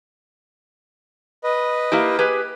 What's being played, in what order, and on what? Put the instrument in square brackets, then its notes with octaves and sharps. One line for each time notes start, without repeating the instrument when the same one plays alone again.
[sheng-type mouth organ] B4 D#5
[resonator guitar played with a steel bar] A#3 E4 G4
G4 G#4 B4